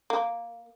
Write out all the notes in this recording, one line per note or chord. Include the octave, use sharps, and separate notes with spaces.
A#3